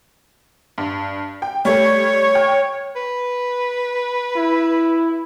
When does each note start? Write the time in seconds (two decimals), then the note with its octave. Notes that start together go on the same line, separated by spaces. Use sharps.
0.78 G2
1.42 G5
1.65 G3 A3 C#5
2.35 G5 F6
2.96 B4
4.36 E4